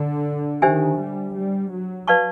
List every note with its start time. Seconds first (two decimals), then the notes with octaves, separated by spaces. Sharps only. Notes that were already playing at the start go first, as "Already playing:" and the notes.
Already playing: D3
0.62 D#3 D4 G4 C5 E5 G#5
0.99 G3
1.35 G3
1.71 F#3
2.07 B4 D5 F5 A5 C#6